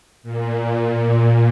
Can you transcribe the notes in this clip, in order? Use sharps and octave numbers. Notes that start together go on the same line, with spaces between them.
A#2